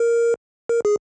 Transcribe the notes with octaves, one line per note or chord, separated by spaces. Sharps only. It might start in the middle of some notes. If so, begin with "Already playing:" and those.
Already playing: A#4
A#4
G#4